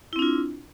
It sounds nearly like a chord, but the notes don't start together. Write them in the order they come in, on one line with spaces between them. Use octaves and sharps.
E4 C4 D4 F4